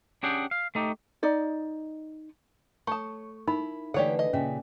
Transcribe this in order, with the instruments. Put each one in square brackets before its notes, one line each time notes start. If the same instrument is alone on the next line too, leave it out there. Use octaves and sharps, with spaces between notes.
[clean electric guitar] C#4 D4 G4 G#4 F#5 G5
F5
A3 D#4 G4
[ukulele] D#4 D5 D#5
[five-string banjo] A3 A5 [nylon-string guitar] C#5 [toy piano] C#6 D#6
[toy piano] D#4 A#4 B5 [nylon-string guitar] E4
[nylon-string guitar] D3 E3 A3 [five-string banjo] G4 C#5 F#5 [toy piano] A4 D5
[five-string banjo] D#5
[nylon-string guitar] A#2 C#3 E5 [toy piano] C#4